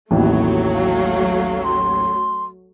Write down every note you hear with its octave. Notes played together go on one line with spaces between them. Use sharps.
A1 D#2 A2 F#3 A3 B3
F5
C6